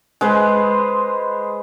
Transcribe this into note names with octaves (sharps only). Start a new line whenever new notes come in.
G#3 B4 C5